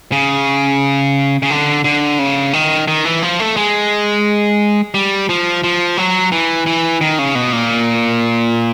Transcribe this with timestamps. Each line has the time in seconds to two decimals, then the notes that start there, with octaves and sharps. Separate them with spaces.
0.12 C#3
1.43 C#3
1.50 D3
1.84 D3
2.19 C#3
2.53 D#3
2.88 D#3
3.05 E3
3.23 F3
3.40 A3
3.56 G#3
4.94 G3
5.29 F3
5.64 F3
5.97 F#3
6.32 E3
6.66 E3
7.01 D#3
7.19 C#3
7.35 B2
7.53 A#2